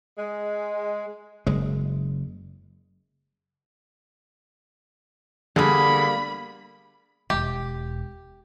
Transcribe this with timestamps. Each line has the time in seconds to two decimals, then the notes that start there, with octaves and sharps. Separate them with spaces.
0.17 G#3
1.47 F#1 G#3
5.56 D3 G3 A#3 G#4 B5
7.30 E1 G4